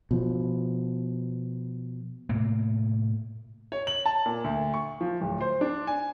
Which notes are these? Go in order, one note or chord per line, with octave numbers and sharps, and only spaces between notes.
B2 F3
A2 C3 A#3
C#5
F#7
A5
A#2
D2
C#6
F3
D1
C5
D4
G#5